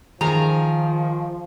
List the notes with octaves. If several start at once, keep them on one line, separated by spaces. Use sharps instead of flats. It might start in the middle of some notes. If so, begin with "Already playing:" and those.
D#3 F3 G#4 A#5